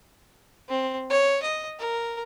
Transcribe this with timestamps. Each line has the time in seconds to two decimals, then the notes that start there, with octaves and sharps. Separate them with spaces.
0.68 C4
1.10 C#5
1.43 D#5
1.79 A#4